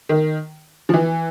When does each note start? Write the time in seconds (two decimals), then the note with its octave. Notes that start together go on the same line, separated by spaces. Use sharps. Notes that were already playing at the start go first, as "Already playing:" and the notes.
0.09 D#3
0.89 F3
0.94 E3